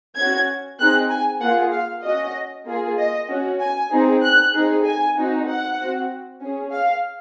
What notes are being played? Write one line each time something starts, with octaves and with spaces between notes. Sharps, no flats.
C#4 F#4 G#6
C4 D#4 G#4 F#6
G#5
A#3 F4 G#4 F#5
F5
C#4 F#4 D#5
A#3 F4 G#4
D#5
C#4 F#4
G#5
C4 D#4 G#4
F#6
C4 D#4 G#4
G#5
C4 D#4 F#4
F#5
C4 F#4
C#4 G#4
F5